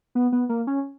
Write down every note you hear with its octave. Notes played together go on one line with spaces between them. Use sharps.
B3
B3
A#3
C#4